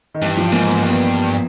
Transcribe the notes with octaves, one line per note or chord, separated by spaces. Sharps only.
D#3
G2 E3
F3
G#2 A#3
B3
G2 A#3
B3